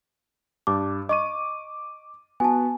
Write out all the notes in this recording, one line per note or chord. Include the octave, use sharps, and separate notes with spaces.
G2 G4 A5 D6
D#5 C#6 D6 D#7
B3 F#4 G#5 A5